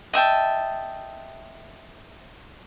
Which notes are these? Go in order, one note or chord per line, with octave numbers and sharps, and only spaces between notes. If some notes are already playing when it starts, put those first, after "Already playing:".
D#5 E5 G5 A5